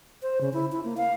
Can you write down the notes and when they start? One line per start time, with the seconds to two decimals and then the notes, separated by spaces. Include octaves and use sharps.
0.22 C5
0.41 C#3
0.53 E4
0.72 E4
0.84 A#3
0.97 F5